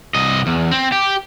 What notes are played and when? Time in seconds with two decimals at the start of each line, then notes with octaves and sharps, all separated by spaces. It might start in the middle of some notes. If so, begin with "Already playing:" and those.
0.15 C2 D#5
0.47 E2
0.72 C4
0.92 G4